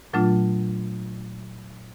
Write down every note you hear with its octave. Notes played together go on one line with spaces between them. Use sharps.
A#2 F#3 A3 D4 F4